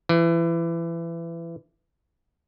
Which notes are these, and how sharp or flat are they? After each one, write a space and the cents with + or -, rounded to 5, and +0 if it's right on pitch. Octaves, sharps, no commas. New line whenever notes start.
E3 +25